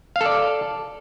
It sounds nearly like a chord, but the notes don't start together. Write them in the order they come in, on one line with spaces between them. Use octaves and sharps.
F5 A4 D5